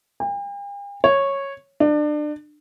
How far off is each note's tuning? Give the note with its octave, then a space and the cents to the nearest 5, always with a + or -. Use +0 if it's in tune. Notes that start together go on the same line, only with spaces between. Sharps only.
G5 +45
C#5 -10
D4 +30